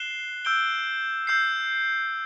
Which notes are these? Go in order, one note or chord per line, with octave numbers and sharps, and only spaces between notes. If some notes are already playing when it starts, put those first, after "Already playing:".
Already playing: F#6 C7 E7 G7
E6 G6 D7 G7
E6 G6 C7